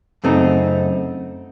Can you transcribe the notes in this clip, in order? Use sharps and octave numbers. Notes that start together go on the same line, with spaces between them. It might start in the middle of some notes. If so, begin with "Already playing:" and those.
F#2 C#3 A3 C4 D#4